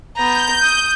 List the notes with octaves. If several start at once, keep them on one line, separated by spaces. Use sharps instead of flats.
B3 A#5 G6
D#6